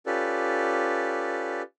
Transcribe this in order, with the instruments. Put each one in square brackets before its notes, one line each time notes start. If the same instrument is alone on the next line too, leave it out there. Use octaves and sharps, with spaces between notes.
[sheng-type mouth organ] C#4 F4 G4 A4 B4 D5